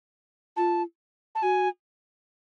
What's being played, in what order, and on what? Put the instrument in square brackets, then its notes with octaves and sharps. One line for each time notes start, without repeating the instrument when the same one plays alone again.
[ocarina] F4 [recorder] A5
[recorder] A5
[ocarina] F#4 [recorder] G#5